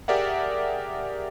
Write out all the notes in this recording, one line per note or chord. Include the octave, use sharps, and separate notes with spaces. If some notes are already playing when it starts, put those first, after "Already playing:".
G4 G#4 A#4 D5 E5 F#5